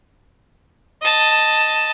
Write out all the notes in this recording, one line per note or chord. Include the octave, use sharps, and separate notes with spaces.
D#5 A5